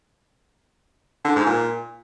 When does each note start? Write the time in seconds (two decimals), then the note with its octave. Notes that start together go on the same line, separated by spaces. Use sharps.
1.25 D3
1.36 G#2
1.46 A#2